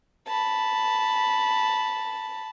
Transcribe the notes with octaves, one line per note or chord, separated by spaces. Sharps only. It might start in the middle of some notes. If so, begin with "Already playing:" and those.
A5 B5